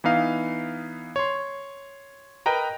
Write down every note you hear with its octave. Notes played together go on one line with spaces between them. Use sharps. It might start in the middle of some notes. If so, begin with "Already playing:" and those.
E3 B3 D#4 F5
C#5 C6
A#4 B4 D#5 G5 A#5